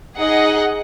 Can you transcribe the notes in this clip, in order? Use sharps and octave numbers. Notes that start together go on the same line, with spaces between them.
D#4 G#4 D#5 F#5